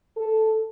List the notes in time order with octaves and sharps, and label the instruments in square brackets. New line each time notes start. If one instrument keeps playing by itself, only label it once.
[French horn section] A4